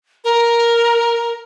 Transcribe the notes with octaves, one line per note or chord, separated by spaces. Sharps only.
A#4